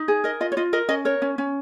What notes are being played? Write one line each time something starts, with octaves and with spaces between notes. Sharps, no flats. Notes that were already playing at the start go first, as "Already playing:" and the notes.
Already playing: D#4
G#4
A#4 D#5
F4 D#5
C#5
F4 D#5
A#4 D#5
C#4 D#5
A#4 C#5
C#4
C#4